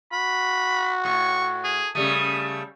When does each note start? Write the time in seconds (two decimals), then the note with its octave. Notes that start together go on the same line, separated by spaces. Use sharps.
0.12 F#4 B5
1.05 A2 C#6
1.64 G#4
1.95 C#3 G3 A3 D#6